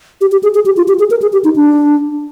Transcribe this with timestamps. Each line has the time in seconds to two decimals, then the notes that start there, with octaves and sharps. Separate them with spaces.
0.21 G4
0.32 G4
0.43 G#4
0.55 G#4
0.66 G4
0.77 F4
0.88 G4
0.99 G#4
1.11 A#4
1.22 G#4
1.33 G4
1.44 D#4
1.56 D4